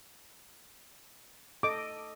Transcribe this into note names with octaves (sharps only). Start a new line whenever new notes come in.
A4 D#5 D6